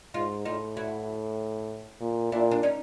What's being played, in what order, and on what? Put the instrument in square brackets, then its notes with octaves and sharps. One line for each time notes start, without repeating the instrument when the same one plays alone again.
[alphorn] G#2 [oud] D#4 F4
[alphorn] A2 [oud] D#4 F4
[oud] E4 F#4
[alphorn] A#2
[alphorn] A#2 [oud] D4 E4
[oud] D4
C#4 D#4